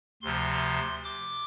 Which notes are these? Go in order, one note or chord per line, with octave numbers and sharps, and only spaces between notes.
D2 C3 F3 C6
D6